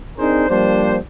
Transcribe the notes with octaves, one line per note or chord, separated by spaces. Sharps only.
C4 D4 D#4 G#4 A#4 C5
F3 G3 A#3 D4 C5